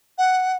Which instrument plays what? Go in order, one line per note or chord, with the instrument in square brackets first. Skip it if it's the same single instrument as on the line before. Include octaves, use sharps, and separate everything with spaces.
[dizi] F#5